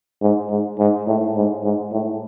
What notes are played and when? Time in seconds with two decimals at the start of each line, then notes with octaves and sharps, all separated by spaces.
0.22 G#2
0.50 G#2
0.79 G#2
1.07 A2
1.36 G#2
1.64 G#2
1.92 A2